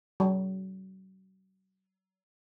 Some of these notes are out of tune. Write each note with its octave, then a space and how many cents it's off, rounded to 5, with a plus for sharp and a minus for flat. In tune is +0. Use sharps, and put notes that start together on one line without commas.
F#3 +40